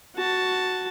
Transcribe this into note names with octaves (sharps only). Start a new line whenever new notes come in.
F#4 A5